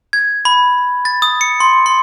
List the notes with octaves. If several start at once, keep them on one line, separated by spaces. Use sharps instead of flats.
G#6
B5
A6
D#6
C#7
C6
C6